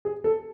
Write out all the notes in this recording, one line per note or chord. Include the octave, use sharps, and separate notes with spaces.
G#4
A4